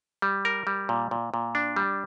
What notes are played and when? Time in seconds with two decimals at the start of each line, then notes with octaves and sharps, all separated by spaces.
0.22 G3
0.45 A#4
0.67 G3
0.89 A#2
1.11 A#2
1.34 A#2
1.55 D4
1.76 G3